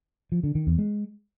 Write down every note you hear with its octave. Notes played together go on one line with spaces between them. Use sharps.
F3
D3
D#3
E2
G#3